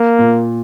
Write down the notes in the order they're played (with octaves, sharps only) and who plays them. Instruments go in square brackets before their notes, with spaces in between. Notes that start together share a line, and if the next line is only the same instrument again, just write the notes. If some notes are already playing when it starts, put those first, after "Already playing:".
Already playing: [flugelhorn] A#3
[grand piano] A#2